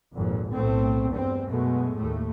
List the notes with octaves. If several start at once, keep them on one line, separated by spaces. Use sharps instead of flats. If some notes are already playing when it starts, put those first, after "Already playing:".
G#1 F2 A#2
B1 A2 A3 C4
E2 G2 C4
F#2 B2 G#3 A3
D#2 A2 A3